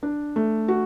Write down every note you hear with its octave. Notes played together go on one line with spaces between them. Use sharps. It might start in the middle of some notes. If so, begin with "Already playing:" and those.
D4
A3
F#4